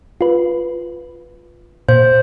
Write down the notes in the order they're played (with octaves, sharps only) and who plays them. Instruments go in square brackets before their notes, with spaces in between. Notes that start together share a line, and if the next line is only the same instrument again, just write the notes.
[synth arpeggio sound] F4 B4
[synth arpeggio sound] A#2 [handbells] C5